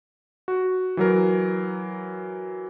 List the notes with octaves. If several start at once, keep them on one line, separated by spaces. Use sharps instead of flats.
F#4
E3 F#3 A#4